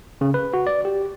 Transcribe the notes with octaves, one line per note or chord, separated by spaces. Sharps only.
C#3
B4
F#4
D5
G4